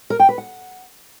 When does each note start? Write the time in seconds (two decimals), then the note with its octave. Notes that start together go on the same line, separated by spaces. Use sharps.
0.10 A#4
0.20 G5
0.29 B4
0.38 F#5